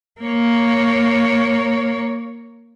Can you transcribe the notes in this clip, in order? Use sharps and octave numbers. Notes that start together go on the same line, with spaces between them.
A#3 C#5